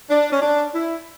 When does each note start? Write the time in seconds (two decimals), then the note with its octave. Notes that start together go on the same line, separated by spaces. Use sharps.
0.10 D4
0.32 C#4
0.42 D4
0.74 E4